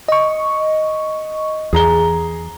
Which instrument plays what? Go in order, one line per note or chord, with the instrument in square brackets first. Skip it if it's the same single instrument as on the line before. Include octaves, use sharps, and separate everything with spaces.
[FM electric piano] D#5 C#6
[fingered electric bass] E2 [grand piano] G#4 A#5 G7